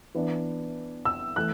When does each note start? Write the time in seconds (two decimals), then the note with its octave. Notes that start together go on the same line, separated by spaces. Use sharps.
0.15 E3 B3 D4
1.05 E6
1.36 E3 A3 F#6